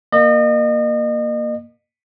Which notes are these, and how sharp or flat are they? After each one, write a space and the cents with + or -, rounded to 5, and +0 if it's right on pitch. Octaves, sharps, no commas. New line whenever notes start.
A#3 +0 D#5 -35